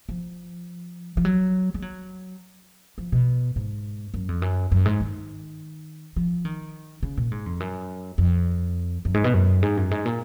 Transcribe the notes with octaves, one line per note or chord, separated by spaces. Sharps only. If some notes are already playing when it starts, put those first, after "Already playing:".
F3
F3
F#3
G#3
F#3
F3
B2
G#2
F#2
F2
F#2
F#2
G#2
D#3
F3
D#3
C#3
A#2
G#2
F2
F#2
F2
F#2
G#2
B2
F#2
G#2
F#2
G#2
A#2